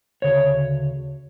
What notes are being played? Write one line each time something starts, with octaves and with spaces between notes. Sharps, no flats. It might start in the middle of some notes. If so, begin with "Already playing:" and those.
D2 C#3 C#5